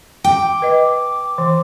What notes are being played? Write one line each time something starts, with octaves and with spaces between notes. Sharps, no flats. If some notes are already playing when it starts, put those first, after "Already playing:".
G5 D6
B4 D#5
E3